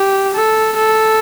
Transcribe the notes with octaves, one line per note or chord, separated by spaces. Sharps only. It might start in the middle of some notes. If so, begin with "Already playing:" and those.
Already playing: G4
A4
A4